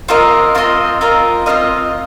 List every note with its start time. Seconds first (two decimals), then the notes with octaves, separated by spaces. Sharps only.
0.09 C4 F4 A#4 D#5
0.55 C4 F4 A#4 D#5
1.01 C4 F4 A#4 D#5
1.46 C4 F4 A#4 D#5